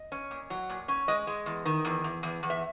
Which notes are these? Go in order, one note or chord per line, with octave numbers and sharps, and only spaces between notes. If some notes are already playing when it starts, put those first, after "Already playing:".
Already playing: D#5
C#4
A#2
F#3
A#2
C#4
G#3 D#5
G#3
E2
D#3
E2
E2
E2
E2
E5